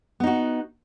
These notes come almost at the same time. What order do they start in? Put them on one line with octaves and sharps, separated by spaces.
B3 D#4 F#4